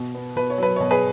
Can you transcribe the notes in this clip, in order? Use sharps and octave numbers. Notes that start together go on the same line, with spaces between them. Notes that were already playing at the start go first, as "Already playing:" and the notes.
Already playing: B2
B3
B2 B4
C#5
F#3 B4
B2 C#5
G#4 B4